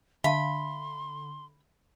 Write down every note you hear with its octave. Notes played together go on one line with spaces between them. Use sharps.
D3 E5 F5 A5 B5 C6